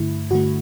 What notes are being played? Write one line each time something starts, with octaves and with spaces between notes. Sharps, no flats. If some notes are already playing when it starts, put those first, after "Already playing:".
Already playing: G2 D3 A3 E4
G2 D3 A3 F#4